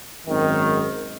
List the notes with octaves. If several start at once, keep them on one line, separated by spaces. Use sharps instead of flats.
G#1 F#2 D#3